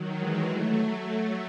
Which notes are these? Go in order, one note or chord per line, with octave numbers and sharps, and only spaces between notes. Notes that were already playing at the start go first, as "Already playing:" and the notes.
Already playing: D#3 F#3
E3 G#3
F#3 A3